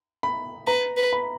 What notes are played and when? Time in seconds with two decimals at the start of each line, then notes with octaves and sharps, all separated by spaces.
0.23 B5
0.67 B4 A#5
0.97 B4
1.13 B5